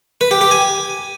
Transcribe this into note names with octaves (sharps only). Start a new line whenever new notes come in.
B4
G4
G4
G#5